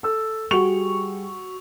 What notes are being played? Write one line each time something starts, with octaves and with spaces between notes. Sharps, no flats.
A4 E6
G3 F#4 G#4 C#6 F7